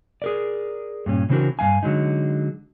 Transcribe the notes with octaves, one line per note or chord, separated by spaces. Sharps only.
G#4 A#4 D5
G2 A#2 C#4
C#3 E3 C4 D4 F#4 A#4
G2 G#3 F5 G#5
D3 F#3 G#3 D#4